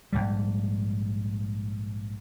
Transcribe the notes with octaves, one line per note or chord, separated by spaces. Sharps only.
A#1 D#2 G#2 G3